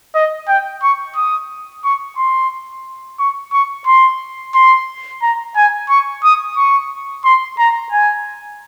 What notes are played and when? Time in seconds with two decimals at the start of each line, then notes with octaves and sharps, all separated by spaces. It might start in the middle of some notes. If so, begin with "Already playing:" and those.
0.15 D#5
0.48 G5
0.83 C#6
1.16 D#6
1.84 C#6
2.18 C6
3.19 C#6
3.53 C#6
3.87 C6
4.55 C6
5.22 A#5
5.56 G#5
5.89 C#6
6.24 D#6
6.57 C#6
7.24 C6
7.59 A#5
7.92 G#5